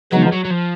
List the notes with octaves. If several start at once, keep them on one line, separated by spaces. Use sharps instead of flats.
C#3 E3 F#3 G#3 B3 D#4
F3
F#3
F#3
F3